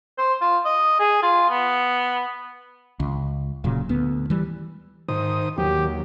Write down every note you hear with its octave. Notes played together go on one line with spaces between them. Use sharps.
C5
F4
D#5
G#4
F4
B3
C#2
D1 A#2 C#3 F#3
D2 B3
E3 G3
G#2 D#3 C5 D#6
D#2 D#3 F#3 G4